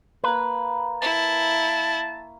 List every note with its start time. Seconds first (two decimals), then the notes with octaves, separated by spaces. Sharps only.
0.24 A#3 B4 C#5
1.02 E4 A5